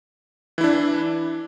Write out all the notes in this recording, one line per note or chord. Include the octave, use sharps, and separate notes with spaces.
E3 D4 E4